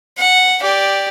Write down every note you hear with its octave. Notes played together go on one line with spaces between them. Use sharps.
F#5
G4 D5